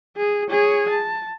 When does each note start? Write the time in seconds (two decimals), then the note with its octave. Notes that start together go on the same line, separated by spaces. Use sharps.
0.17 G#4
0.50 G#4 C#5
0.89 A5